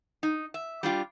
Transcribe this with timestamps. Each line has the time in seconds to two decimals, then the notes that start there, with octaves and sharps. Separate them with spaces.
0.23 D#4
0.54 E5
0.83 G3 D4 F4 G4